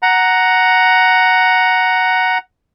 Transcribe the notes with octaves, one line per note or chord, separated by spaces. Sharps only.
F#5 A#5